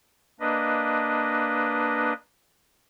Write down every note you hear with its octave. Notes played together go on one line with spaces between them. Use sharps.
A#3 D4 B4 D#5